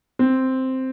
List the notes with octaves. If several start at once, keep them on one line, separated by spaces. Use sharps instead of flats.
C4